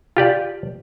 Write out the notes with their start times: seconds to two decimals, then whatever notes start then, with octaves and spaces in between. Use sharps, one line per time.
0.17 F4 G4 D5